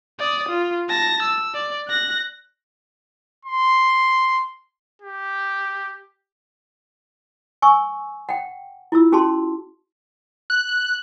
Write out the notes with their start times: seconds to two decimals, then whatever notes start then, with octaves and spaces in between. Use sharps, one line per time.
0.19 D5 D#6
0.49 F4
0.88 A5 A#6
1.23 E6
1.54 D5
1.88 F#6 A#6
3.45 C6
5.02 G4
7.62 G#5 C#6 E6
8.29 F#5 G5
8.92 E4 F4 E6
9.12 C#4 F#4 G#4 A5 C6
10.50 F#6